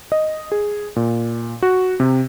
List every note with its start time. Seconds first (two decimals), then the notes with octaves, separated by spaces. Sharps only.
0.12 D#5
0.52 G#4
0.96 A#2
1.63 F#4
2.00 C3